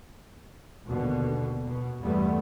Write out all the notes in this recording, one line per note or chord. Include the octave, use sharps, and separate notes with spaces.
D#2 B2 D3
B2
E2 G2 G3 A3 B3